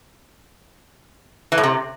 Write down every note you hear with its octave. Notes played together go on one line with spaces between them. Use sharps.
E3
A2
C3